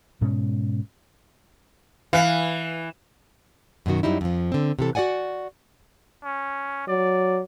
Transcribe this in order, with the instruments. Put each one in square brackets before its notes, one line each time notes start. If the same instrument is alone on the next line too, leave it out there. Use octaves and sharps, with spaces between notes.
[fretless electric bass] G#2 B2 G#3 C#4
[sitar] E3 [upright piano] F5
[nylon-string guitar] F#2 B2 D#3 F#4
F#2 F#3 G3 D#4 E4
F2 F3
D3 C4
C3 E3 A4
F#4 G#4 D5 F#5 G#5
[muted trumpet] C#4
[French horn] F#3 [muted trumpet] D5